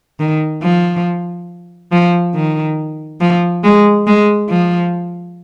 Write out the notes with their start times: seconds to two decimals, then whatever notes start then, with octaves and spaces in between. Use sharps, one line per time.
0.20 D#3
0.62 F3
1.92 F3
2.35 D#3
3.21 F3
3.64 G#3
4.07 G#3
4.49 F3